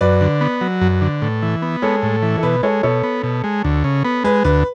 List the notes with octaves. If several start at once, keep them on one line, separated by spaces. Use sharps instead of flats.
F#2 B4 D5
D3
B3
F#3
F#2
D3
A2
E3
B3
G#3 A4 C#5
A2
E3
A4
B2 B4
G#3 A4 C#5
B2 A4 C#5
B3
B2
G#3
D2
C#3
B3
G#3 B4
D2 B4